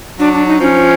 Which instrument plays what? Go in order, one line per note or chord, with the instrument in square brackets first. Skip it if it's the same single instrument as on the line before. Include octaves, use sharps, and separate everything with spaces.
[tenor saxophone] F#3 [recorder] D4
[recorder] D4
D#4
[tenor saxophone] F3 [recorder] C#4